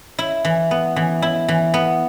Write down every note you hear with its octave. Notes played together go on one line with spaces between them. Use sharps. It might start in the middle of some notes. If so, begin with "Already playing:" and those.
E4
E3
B3
E3
E4
E3
B3